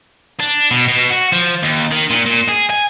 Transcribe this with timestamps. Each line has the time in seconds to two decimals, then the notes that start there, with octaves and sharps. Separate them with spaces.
0.40 D4
0.71 B2
0.88 B2
1.10 F#4
1.33 F3
1.63 D#2
1.91 D#3
2.10 A#2
2.26 A#2
2.49 G#4
2.70 G#5